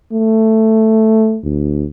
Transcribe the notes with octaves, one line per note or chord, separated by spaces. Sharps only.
A3
D2